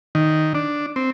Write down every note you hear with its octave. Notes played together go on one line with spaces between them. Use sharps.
D#3
D4
C4